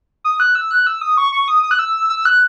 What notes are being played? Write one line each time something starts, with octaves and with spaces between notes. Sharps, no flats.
D#6
F#6
E6
F#6
E6
D#6
C#6
C#6
D#6
D#6
F#6
E6
E6
F#6